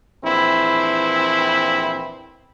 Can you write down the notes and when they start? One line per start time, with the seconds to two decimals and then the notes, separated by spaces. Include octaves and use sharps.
0.23 A#1 E3 C4 E4